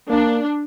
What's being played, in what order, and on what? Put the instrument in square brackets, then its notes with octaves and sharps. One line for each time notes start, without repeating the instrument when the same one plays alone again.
[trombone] A#3 [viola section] D4